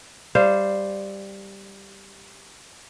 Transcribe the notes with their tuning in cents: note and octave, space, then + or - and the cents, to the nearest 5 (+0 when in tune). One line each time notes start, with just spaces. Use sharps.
G3 +5 C5 +0 F5 -20